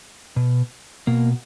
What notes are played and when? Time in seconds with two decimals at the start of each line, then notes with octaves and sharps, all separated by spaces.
0.36 B2
1.07 B2 A#3